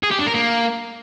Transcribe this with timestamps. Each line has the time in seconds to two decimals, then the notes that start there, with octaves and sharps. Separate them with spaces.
0.03 G#4
0.11 G4
0.19 D4
0.26 A#4
0.34 A#3